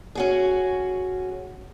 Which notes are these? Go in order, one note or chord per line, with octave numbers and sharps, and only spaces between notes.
C#4 F#4 G#4